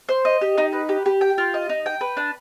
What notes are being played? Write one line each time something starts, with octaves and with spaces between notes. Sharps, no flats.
C5
D#5
G4
D#4
B4
G4
G4
G5
F4
D#5
D#4
G5
B4
D4